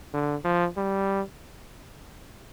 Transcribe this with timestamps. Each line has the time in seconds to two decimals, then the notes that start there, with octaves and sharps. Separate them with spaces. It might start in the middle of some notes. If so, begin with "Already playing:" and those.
0.13 D3
0.44 F3
0.77 G3